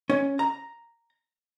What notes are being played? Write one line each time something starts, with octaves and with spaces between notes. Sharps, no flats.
C#4
A#5